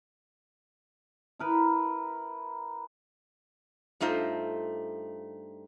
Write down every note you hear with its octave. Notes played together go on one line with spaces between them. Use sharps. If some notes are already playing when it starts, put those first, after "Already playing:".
E4 A#4 B4
G2 A3 D#4 F4 C5